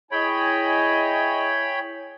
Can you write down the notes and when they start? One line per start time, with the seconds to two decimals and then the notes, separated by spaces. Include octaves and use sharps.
0.12 E4 G#4 C#5 D#5 G5 G#5 B5